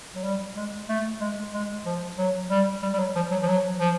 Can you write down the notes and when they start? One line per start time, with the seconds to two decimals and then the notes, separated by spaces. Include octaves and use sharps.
0.15 F#3
0.23 G3
0.56 G#3
0.89 A3
1.20 G#3
1.53 G#3
1.86 F3
2.18 F#3
2.50 G3
2.82 G3
2.93 G3
2.99 F#3
3.16 F3
3.31 F#3
3.43 F3
3.47 F#3
3.80 F3